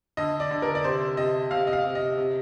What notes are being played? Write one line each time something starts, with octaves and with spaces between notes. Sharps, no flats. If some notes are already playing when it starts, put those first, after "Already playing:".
D3 D#5
D5
D3
A#4
D5
C3 C5
C3 D#5
C3 F5
D#5
F5
C3
D#5
C3